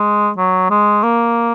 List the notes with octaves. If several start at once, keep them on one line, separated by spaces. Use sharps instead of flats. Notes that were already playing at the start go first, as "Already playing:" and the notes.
Already playing: G#3
F#3
G#3
A#3